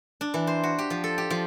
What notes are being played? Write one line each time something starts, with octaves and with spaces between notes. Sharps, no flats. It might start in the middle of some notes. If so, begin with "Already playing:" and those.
D4
E3
C5
F#4
G4
F3
A4
G4
F3